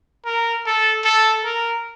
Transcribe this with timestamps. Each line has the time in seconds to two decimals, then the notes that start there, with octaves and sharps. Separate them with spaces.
0.25 A#4
0.66 A4
1.05 A4
1.45 A#4